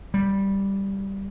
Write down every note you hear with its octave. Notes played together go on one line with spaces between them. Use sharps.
G3